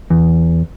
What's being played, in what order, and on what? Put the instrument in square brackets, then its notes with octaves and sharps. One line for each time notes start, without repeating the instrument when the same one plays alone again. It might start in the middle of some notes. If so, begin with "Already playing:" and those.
[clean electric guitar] E2